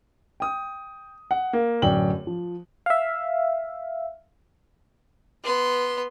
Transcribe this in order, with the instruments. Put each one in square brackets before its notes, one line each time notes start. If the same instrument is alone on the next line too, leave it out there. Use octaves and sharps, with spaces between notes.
[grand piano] G5 D#6
F#5
A#3
D1 F#2 D5 G5 F#7
F3
[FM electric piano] E5 F5
[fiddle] B3 C6